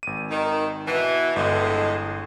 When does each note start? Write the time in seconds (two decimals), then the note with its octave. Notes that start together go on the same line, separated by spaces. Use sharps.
0.03 G#1 D#7
0.31 D#3
0.87 B2 E3
1.36 G1 A2 G#3